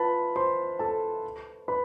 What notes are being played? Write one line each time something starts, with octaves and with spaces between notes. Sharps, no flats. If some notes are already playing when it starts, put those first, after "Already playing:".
Already playing: F4 B4 A5 B5
C5 C6
A4 A5
B4 B5